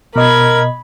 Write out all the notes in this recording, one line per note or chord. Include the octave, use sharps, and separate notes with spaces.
B2 A#4 D#5 B5 G#6